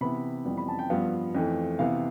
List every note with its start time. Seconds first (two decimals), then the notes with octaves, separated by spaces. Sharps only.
0.01 C3 E3 B3 B5
0.45 F2 E3 G3 B3
0.57 B5
0.68 A5
0.79 G5
0.90 G2 F3 B3 F5
1.35 F2 E3 A3
1.79 C3 E3 B3 F5